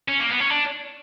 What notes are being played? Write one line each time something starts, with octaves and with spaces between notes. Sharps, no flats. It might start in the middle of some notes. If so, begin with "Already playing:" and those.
C#4
A#3
B3
C#4
D4